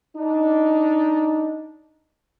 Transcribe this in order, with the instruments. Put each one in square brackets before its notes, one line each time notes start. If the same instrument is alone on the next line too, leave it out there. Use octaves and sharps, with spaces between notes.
[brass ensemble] D4 D#4